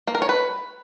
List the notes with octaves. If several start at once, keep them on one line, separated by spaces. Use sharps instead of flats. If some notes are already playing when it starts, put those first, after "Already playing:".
A#3
A#4
C#5
B4